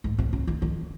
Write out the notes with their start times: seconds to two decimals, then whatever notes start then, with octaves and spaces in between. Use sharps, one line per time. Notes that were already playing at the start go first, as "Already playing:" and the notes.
0.04 G#2
0.18 C3
0.33 C#3
0.47 D#3
0.62 D#3